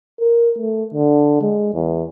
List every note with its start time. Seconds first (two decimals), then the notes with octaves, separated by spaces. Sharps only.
0.20 A#4
0.58 A3
0.94 D3
1.41 G#3
1.74 E2